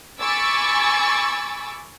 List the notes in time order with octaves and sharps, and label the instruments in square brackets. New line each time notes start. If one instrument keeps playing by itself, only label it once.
[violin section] G#5 B5 C#6 D6 E6 A6